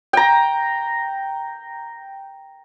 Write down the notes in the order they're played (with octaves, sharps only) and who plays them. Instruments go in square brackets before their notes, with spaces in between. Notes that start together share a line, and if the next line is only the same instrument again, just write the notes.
[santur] G5 A#5